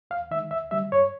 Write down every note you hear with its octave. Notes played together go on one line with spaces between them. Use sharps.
D#2 F5
D#3 G#3 E5
D2 E5
D3 G3 E5
G2 C#5